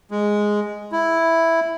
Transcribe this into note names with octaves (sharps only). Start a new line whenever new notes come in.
G#3
E4